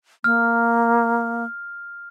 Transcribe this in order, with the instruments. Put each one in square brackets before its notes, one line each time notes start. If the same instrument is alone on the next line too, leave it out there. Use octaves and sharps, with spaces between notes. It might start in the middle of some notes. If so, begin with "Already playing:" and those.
[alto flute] A#3 [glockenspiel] F6